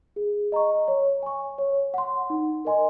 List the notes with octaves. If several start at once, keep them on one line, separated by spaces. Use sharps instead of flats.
G#4
D#5 A#5 C#6
C#5
G#5 C#6
C#5
F#5 C6
D#4
A#4 D#5 G#5 C6